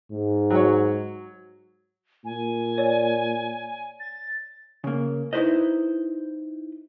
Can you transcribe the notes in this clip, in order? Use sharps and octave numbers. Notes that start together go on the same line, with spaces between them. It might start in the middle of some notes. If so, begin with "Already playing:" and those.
G#2
F#3 C#5
A#2 G#5
C#5 D5
A6
C#3 A#3
D#4 E4 F#4 B4 C5 D#5